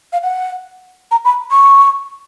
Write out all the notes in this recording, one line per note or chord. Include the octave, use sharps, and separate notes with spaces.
F5
F#5
A#5
B5
C#6